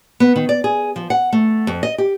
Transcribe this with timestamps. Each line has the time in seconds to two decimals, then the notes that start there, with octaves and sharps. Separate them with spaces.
0.20 B3
0.36 D#3
0.49 D5
0.64 G#4
0.96 F3
1.10 F#5
1.33 A3
1.67 F2
1.83 D#5
1.98 G4